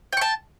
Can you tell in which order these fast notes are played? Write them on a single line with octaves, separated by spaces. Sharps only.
G5 C#6 A5